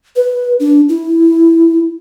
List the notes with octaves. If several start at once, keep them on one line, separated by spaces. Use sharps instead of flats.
B4
D4
E4